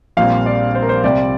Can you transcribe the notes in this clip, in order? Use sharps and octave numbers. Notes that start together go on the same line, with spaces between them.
A#1 A#2 G3 C4 F5
D5
C5
A#4
C5
C2 C3 G3 C4 D5